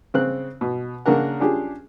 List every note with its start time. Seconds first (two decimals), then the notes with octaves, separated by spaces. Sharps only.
0.14 C#3 C4 F#6
0.61 B2
1.06 C#3 A#3 D4 A#4 F#5
1.40 C#4 D4 F4 G4 G#4